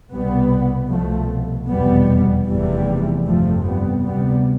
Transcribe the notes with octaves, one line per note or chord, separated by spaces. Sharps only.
C2 B2 G3 B3
C2 B2 F3 A3
F1 E2 B2 G3 B3
F1 E2 C3 E3 G3
G1 F2 C3 F3 A3
G3 B3
D2 C3 G3 B3